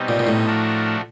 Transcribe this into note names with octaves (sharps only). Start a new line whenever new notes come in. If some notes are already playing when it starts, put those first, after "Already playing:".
Already playing: B2 G3 C4 D#4
A#2
A#2
A2
F3 A3 D4 F#4 A#4